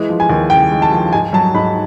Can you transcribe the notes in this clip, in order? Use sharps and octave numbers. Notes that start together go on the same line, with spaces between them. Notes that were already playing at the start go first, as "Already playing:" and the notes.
Already playing: E3 G#3
F3
G#5
D#2
C#3 G5
G#3
A5
F3
G#2 G#5
F#3 A5
G#2 B5